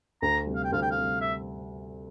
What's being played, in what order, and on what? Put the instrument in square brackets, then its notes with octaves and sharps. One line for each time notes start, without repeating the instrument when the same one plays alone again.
[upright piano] D2 [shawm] A#5
[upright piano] C3 G3
[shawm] F5
G5
[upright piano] D2 [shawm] F5
[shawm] G5
F5
[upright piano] C3 G3
[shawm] E5